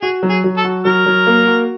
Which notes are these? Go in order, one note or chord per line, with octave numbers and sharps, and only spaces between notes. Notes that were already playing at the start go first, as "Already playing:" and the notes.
F#4 G#4
F#3
G#4
F#3
A4
F#4
F#3 A#4
F#3
A#3
F#4